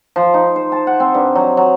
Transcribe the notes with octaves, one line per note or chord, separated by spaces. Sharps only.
F3
D#4
C5
A5
F#5
C4
G2
F#3
F#3